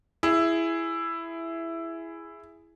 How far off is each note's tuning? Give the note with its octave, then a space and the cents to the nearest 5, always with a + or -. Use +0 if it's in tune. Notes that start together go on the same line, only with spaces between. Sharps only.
E4 +10 G#4 +0